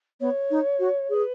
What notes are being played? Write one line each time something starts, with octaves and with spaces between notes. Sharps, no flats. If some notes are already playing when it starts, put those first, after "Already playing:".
B3 C#5
D#4
F#4
G#4 B4 C#5